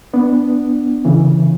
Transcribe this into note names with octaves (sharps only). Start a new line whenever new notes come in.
B3 D4
C#3 E3